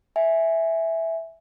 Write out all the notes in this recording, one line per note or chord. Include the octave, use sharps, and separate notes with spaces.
E5 G#5